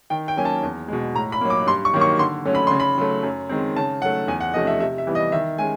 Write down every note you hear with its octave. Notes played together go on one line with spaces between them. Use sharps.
D#3 G5
G5
F#3 A#3 C#4 G#5
A5
E2
B2 G#3
A2 A#5
B5
F#3 A#3
D6
G2 C6
C#6
D#3 F#3 A#3
C#6
D3 C6
F#3 A3 C#4
B5
C#3 C6
B5
F#3 A3
F#2
D#3 G#3 C4
C#3 A5
F#3 A3 F#5
E2 G#5
F#5
C3 F3 A3 C#4 D#5
E5
C3 E5
E5
E3 G3 B3
D#5
D#3 E5
G#3 C#4 G#5